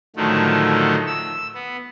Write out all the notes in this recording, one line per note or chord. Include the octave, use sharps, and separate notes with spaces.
A2 D3 D#3 F3 F#3 A3
E6
B3